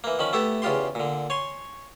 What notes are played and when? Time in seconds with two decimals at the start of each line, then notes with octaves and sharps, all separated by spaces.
0.04 E3 A#3
0.19 D#3 F3 C#4 B5
0.33 A3 B3 E4 G4 A4
0.62 E2 C#3 F4 G4 C6
0.95 A#2 D3
1.30 C#5 G#5 C6